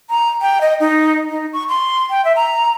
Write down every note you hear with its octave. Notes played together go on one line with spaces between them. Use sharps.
A#5
G5
D#5
D#4
D#4
C#6
C6
G5
E5
A#5